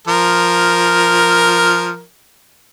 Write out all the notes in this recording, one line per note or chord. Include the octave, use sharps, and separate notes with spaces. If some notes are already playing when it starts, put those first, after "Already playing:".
F3 A#4